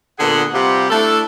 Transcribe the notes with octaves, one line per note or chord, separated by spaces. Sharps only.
A#2 D3 B3 G#4 F#5
C3 G3 C4 F4 G4 F#5
A3 D4 E4 A4